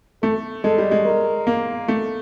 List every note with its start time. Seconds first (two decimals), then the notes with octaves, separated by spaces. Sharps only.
0.22 A3 A4
0.64 G#3 A4
0.78 G3
0.91 G#3
1.06 A#4
1.47 A#3
1.88 A3